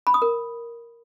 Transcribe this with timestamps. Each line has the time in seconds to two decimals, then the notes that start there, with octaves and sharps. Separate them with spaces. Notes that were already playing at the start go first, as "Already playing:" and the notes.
0.07 B5
0.14 D#6
0.22 A#4